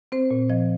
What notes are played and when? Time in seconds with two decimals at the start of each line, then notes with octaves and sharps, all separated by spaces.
0.12 C4 C5
0.31 A#2
0.50 F3 D#5